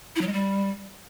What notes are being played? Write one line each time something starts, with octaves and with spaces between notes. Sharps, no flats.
E4
F#3
G#3
G3